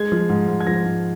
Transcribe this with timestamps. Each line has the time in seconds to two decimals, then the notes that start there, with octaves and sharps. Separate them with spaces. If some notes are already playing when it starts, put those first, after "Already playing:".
Already playing: G#3 G#6
0.12 F3
0.29 G#2
0.48 G#2
0.60 G#6
0.67 F3 A#6
0.85 G#2